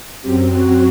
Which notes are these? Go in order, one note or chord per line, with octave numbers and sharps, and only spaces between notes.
F#2 F#3 C4 G4
F#4